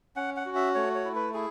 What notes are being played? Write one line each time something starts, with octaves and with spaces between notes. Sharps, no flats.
C#4 F#5
F#5
F#4
E5
A3 C#5
C#5
E4
B4
E4 G#4